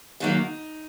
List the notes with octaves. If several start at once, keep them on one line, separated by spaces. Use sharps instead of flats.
G#2 D#3 F#3 A#3 D#4